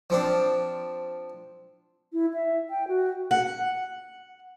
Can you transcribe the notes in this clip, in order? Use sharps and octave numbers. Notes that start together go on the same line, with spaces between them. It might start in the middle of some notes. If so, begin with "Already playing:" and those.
F3 C4 D4
E4
E5
G5
F#4
F#5